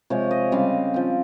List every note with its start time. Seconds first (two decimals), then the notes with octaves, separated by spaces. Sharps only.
0.10 C3 F3 G#3 C#5
0.31 D#5
0.52 C#3 G3 C4 F5
0.94 F3 C4